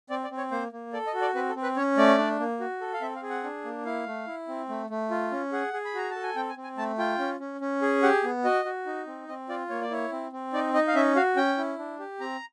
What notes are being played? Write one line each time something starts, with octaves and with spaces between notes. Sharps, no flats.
C4 D5
D5
C4
C#5
A#3 C5
A#3
A4 D5
D#5
F#4
D5
C4 B4
A4
C4
B4
C#4 C#5
A3 D5
D4
A#3
F#4
A4
F5
C4 E5
F5
G#4
F#5
D4
A#3
E4 F5
A3
E4
C4
A3
A3
F4
C#4
G#4 F#5
G#4
B5
F#4 A#5
A4 A5
G#5
C4 G5
G#5
C4
G#5
A3 A5
F4 G5
C#4
C#4
C#4
G#4
G4 F#5
B3
F#4 D#5
F#4
D#4
C4
C4 D#5
F4 D5
A#3 C#5
D5
E4 C#5
C4
C4
D#4 D5
D#4 D#5
F5
C#4 E5
F#4 F5
C#4 G5
E4
D4
G4
C4 A#5